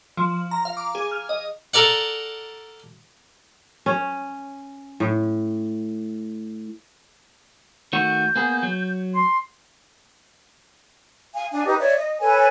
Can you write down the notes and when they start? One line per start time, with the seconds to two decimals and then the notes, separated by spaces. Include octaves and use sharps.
0.17 F3
0.51 A#5
0.65 F5
0.77 D6
0.95 G#4
1.11 F6
1.29 D#5
1.74 A4 A#4 D5 F#5
3.86 C#4
5.00 A2
7.93 D#3 A3 F#4 G6
8.36 A#3 B3 G#4
8.63 F#3
9.14 C6
11.33 F5 G#5
11.51 D4 F5 G#5
11.66 D#4 G4 B4
11.79 C#5 D5 E5
11.97 D#5
12.20 A4 B4 C#5 G#5